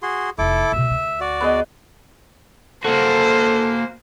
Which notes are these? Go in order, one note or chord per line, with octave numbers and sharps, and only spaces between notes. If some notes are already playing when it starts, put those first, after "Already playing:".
F#4 G#4 C6
F1 D#4 E4 A4 D6
D2 B2 E5
D2
F#4 D5
B3 G#4 D#5
A#3 F#4 A4 C5